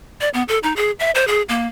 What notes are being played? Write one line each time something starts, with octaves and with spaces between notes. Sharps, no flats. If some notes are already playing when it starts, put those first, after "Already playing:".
D5
B3
A4
D#4
G#4
E5
C5
G#4
A#3